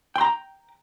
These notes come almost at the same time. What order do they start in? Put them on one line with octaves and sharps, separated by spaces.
G5 C6 A#5